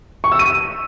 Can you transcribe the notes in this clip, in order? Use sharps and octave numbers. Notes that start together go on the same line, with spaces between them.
C#6
E6
D#7